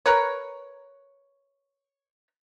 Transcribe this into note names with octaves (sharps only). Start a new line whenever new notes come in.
A#4 B4 C#5